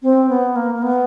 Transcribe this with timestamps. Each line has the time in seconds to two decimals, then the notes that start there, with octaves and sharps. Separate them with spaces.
0.03 C4
0.29 B3
0.56 A#3
0.75 A#3
0.82 B3